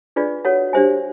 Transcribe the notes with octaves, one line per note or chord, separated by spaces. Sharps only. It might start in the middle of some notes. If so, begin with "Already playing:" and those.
D4 F4 G#4 B4 D5
F#4 A4 C#5 F#5
D4 G4 C5 E5 G#5